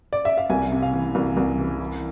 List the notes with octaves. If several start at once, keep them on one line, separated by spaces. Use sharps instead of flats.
D5
E5
F5
C2 G#5
C3
F5
E3
C2
C2
E3
E3